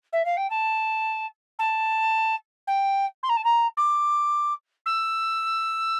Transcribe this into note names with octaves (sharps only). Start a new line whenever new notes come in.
E5
F5
G5
A5
A5
G5
C6
A#5
A5
A#5
D6
E6